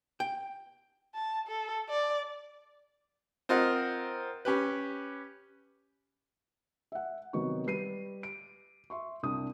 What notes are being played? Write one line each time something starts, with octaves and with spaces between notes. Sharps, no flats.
G5
A5
A4
D5
C4 F4 A#4 D#5 F#5
C#4 G4 B4
E5 F#5
C3 D#3 F#3 B3 F#4 C#6
G3 B4 C7 D#7
D7
E5 C6 C#6
C2 D4 D#6